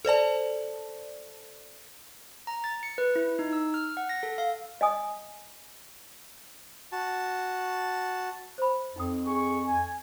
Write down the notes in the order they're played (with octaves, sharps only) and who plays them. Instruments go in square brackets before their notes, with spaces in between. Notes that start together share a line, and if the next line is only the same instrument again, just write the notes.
[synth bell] A4 C5 D5 A5
[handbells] A#5
A6
C#7
B4
E4
D#4
E6
F6
F#5
A#6
A4
F5
[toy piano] D#5 G#5 D#6
[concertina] F#4 A5
[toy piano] C5 B5
[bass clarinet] F2 [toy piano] D#4 G5 D#6
[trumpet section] G#4 C#6
G#5